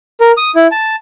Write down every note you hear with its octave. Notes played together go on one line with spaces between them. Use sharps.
A#4
D#6
E4
A5